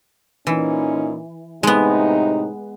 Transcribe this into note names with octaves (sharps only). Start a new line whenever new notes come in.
A#2 E3 C#4 D#4
A2 C3 G#3 B3 D#4